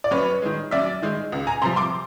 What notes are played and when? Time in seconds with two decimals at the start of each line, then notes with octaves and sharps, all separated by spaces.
0.04 D5
0.11 F#2 B4 C#5
0.42 D#3 G#3
0.71 F#2 D5 E5
1.02 D#3 G#3
1.32 C#2
1.47 G#5 A#5
1.62 C3 F3 A#5 C6
1.76 C6 D6